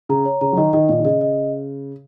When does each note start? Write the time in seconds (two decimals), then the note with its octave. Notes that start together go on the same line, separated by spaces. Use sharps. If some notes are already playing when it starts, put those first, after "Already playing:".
0.09 C#3 A#5
0.25 C#5
0.41 C#3 A#5
0.53 F#3
0.57 D#3 D#5
0.73 D#3 D#5
0.89 A#2 D#5
0.99 D#3
1.04 C#3 D#5
1.21 D#5